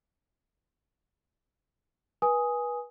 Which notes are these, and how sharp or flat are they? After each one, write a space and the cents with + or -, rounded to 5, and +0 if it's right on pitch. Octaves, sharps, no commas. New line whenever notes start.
B4 -30 G#5 +0 D#6 +5